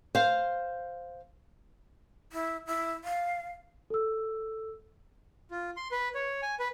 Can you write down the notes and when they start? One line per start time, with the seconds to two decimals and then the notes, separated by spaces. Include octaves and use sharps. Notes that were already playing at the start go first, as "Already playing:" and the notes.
0.15 C5 F5
2.33 E4
2.67 E4
3.04 F5
3.90 A4 E6
5.51 F4
5.77 C6
5.91 B4
6.15 C#5
6.42 G#5
6.60 B4